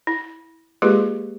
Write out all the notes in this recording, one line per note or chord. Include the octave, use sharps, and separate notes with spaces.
E4
G#3 A#3 F4 G4 G#4 B4